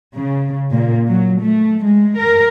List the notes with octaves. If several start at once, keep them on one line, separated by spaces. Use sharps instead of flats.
C#3
A#2
F#3
A3
G#3
A#4